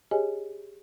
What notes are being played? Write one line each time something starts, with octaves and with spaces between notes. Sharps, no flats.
G4 G#4 C#5 D#5 G#5